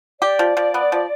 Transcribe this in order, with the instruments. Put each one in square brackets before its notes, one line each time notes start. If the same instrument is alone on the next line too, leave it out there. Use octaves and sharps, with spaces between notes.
[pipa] G4 [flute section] D5
[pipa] F3
F3
B3
F3